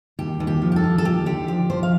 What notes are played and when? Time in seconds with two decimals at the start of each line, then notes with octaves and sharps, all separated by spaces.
0.19 D#2 G4
0.40 D#2
0.47 G4
0.62 F3
0.72 G4
0.76 A4
0.84 F3
0.98 A4
1.05 D#2 G4
1.26 D3 G4
1.48 F3 G4
1.70 F3 C5
1.83 F5